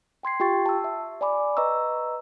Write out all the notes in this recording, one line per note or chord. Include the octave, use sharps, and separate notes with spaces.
G5 C6 G#6 C7
F4 G4 G5 C#6 A6
A5 E6
E5
D5 G#5 B5 D6
B4 D#5 A#5 C#6 E6